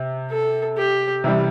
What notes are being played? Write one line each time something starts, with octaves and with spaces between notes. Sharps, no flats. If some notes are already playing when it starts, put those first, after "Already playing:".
Already playing: C3
A4
G4
C3 E3 G3